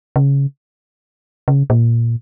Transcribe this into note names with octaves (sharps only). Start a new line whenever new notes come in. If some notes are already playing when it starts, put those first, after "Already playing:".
C#3
C#3
A#2